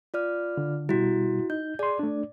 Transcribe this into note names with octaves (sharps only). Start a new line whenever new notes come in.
F4 D5 F6
D3
B2 G3 E4 F#4
D#4 G6
G#4 D5 C6
A3 D4